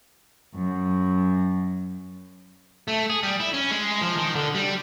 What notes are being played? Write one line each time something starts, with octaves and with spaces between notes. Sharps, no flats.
F#2
A3
G#4
G3
E4
C#4
G#3
F3
D#3
D3
G3